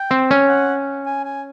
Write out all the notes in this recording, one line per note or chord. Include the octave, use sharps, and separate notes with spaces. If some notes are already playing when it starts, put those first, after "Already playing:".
Already playing: G5
C4
C#4
F#5
G#5
G#5